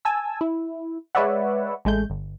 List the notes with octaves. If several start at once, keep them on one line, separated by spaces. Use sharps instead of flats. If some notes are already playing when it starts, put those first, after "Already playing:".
G#5 A5 E6
E4
G#3 B4 C#5 D5 E5 F#5
A1 G#3 A3 G6
G1